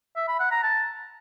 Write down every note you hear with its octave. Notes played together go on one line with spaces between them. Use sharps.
E5
B5
F#5
A#5
A5